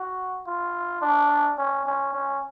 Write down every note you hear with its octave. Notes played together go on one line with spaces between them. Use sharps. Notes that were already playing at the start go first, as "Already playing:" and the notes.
Already playing: F#4
F4
D4
C#4
C#4
C#4